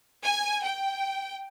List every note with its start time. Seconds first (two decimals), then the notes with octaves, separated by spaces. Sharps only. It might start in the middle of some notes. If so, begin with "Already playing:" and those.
0.23 G#5
0.63 G5